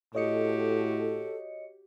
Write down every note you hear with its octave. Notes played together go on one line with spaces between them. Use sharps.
A2 F#4 G4 A4 C#5 D#5 C#7